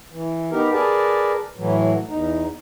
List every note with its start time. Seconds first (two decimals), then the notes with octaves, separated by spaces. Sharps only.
0.12 E3
0.51 B3 D#4 G4 A#4
0.73 G#4 A#4 B4 D5 A5
1.57 A2 E3 F#3
2.09 E2 D#4